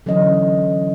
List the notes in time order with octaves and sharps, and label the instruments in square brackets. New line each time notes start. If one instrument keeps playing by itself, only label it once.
[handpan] D3 E3 F#3 C#4 D#5